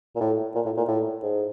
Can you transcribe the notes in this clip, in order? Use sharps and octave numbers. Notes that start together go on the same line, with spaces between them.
A#2
A2
A#2
A2
A#2
A2
G#2